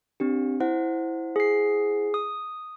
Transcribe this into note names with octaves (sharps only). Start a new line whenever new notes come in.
C4 D4 G4
E4 C5 F#5
G#4 C7
D#6